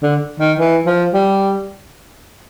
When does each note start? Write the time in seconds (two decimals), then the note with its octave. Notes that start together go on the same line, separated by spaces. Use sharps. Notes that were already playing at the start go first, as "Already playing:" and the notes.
0.03 D3
0.40 D#3
0.58 E3
0.86 F3
1.14 G3